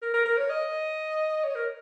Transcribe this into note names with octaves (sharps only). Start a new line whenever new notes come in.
A#4
A#4
A#4
C#5
D#5
C#5
A#4